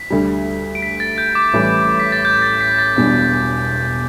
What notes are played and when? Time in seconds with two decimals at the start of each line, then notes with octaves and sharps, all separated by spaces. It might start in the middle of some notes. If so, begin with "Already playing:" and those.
Already playing: B6
0.10 D2 D3 G3
0.75 D7
0.82 B6
1.00 A6
1.18 G6
1.35 D6
1.53 A1 A2 E3 G3
2.00 B6
2.12 A6
2.25 G6
2.42 A6
2.61 B6
2.79 A6
2.96 E1 E2 B2 G3 D4